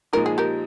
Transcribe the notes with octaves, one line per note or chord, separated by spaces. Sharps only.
A#2 F3 G#3 D#4 A#4
G#4
G4 A#4